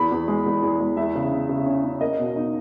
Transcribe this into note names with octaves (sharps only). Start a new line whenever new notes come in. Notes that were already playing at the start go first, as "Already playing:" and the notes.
Already playing: E2 B5
E2
G#3
E2
E2
G#3
E2 E5
C#3
C#4
C#3
C#4
C#4
A#3 D#5
B2
D#4